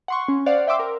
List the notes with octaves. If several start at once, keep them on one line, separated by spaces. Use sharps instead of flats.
F#5 C6 C#6
C#4
C5 D5 F5 F#5
E5 G5 C6 D6 E6
A#4